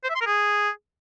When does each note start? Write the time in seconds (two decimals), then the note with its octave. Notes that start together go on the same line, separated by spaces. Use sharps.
0.04 C5
0.09 E5
0.15 C6
0.21 A#4
0.26 G#4